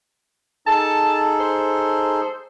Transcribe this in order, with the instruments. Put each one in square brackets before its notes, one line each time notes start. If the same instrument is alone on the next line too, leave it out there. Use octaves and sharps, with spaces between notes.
[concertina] D#4 G#4 A4 [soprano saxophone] A5
[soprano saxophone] C5